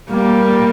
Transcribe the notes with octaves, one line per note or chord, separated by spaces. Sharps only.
G3 A#3